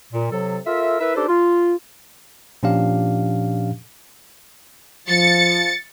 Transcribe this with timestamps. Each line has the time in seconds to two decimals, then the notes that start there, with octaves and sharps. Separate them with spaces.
0.13 A#2
0.31 C3 F#3 A4
0.66 F4 A4 A#4 E5
0.99 E4 A#4 B4 E5
1.16 D4 D#4 G4 A4 B4 C5
1.28 F4
2.63 A#2 F3 C#4 D4 G4 F5
5.08 F3 A6 C#7